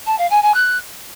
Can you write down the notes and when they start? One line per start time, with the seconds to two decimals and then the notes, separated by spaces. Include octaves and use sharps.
0.06 A5
0.18 F5
0.30 G#5
0.42 G#5
0.54 F#6